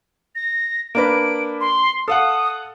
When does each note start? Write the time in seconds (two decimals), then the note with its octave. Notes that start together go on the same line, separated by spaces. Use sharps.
0.35 A#6
0.95 A#3 D4 B4 D7
1.61 C6
2.08 A4 F5 F#5 D#6